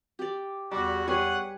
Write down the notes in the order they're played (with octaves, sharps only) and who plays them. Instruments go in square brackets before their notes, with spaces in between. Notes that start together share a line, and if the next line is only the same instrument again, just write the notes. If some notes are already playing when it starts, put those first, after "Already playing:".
[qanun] G4 D5
[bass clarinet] E2 [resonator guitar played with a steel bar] G3 [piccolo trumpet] F#4
[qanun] G3 B4 G#5 [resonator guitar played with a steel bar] G#4 C#5 [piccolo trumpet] F#5